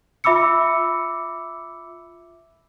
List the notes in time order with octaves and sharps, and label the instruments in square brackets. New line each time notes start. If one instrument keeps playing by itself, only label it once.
[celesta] F4 E5 B5 D6 E6 C#7